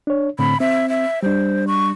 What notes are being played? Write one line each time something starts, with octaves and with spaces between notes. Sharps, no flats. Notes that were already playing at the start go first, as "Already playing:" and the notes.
D4 C#5
A2 D3 C4 B5
C4 E5
E5
G3 D4 C5
C#6